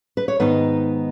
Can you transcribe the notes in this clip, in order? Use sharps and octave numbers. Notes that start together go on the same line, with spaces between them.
B4
C#5
G#2 D#3 B3 D#4 B4